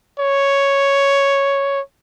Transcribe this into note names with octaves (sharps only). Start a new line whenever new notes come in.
C#5